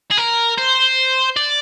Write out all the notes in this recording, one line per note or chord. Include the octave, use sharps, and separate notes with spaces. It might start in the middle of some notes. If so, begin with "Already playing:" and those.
G#4
A#4
C5
D5